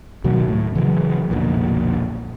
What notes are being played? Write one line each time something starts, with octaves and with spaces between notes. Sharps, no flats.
D2 B2 D#3 F#3
A2
C#3 E3 F#3
B1 F2 A#2 D3